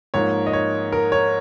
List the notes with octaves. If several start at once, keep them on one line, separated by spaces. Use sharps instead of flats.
G#2 F3 A#3 C#5
D#5
C#5
A#4
C#5